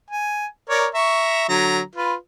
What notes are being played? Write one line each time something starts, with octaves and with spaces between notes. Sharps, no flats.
G#5
A#4 C#5 D5
E5 A#5 C#6
D3 F#3 A#5
F4 B4